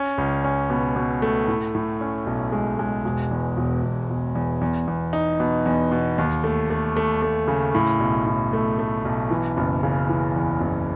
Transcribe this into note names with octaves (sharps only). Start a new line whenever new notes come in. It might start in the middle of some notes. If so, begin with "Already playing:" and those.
Already playing: C#4
C#2
C#4
B2
B2
A3
A2
A2
C#4
B1
G#3
G#3
E1
E2
E1
E1
E1
E2
E2
E2
D#4
B2
E2
B2
D#2
A3
A3
A3
A3
C#3
A2
B1
A2
A3
A3
B1
E3
F#1
C#3
E3
E2
F#1